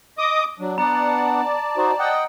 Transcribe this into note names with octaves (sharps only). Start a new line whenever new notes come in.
D#5 D6 D#6
F#3 D4
B3 D4 D5 F#5 A5 A#5
D#4 F#4 C5
D#5 F#5 G5